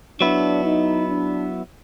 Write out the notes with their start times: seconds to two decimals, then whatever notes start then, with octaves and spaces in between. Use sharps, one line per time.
0.21 F#3 B3 D4 E4
0.65 D#4
1.08 D4